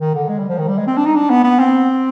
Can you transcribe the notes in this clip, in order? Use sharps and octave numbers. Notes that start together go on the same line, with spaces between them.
D#3
D3
G#3
G3
F3
D#3
G3
G#3
C4
D4
D#4
D4
B3
B3
C4